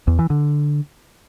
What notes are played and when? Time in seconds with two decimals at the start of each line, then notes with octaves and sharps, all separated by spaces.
0.07 E2
0.19 E3
0.30 D3